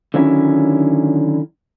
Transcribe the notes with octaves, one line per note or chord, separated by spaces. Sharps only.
D3 D#3 F#3 C#4 E4